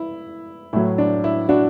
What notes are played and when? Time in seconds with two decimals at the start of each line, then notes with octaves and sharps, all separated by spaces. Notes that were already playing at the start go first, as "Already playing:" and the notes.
Already playing: E4
0.73 A2 F#3 E4
0.98 D4
1.24 E4
1.49 D4 F#4